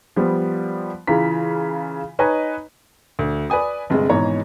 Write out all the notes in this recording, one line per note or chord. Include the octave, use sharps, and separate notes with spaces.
F3 G3 B3
C#3 E3 F4 A#5 B6
D#4 B4 C#5 D#5 G#5 A#5
D2
B4 D5 G#5 D#6
G1 C3 G#3
G#1 G#2 B2 E3 C#5 A#5